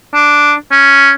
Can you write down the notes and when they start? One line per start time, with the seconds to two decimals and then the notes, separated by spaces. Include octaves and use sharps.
0.14 D4
0.71 C#4